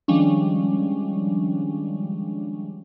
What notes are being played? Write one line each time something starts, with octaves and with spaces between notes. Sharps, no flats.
D#3 F3 G3 G#3 C#4 D4